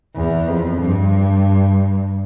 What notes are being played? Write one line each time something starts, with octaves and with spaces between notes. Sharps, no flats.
E2
F2
G2